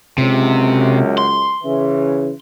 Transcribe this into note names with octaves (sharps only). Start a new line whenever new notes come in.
C#2 F#2 C3
C6
C#3 E3